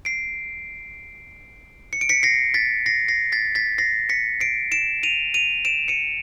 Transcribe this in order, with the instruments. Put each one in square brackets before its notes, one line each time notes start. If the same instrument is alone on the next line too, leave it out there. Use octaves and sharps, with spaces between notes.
[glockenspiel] C7 D7
C#7
D7
B6 C#7
A#6 C7
A6 B6
A#6 C7
A#6 C7
A6 B6
A6 B6
A#6 C7
B6 C#7
C7 D7
D7 E7
D#7 F7
D#7 F7
D7 E7
C#7 D#7